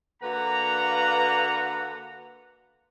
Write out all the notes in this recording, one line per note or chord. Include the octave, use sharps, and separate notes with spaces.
D3 A#3 F#4 B4 F#5 A#5